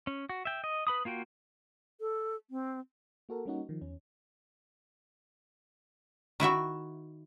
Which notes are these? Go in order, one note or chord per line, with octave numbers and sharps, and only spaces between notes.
C#4
F#4
E5 G5
D#5
B4 B5 D#6
A#3 F4 F#4 G5
A4
C4
A#3 F#4 A4 A#4
G3 A#3 C#4 D#4 F#4
D#3 F3
E2 C#4
D#3 E4 F#4 E5